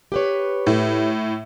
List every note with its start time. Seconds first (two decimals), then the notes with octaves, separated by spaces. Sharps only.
0.12 G4 B4 C#5
0.67 A2